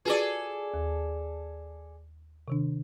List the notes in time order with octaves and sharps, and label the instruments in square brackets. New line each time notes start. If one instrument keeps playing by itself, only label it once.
[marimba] F4 F#4 B4 [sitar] G#4 A4 D5
[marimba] D#2
C3 D#3 D4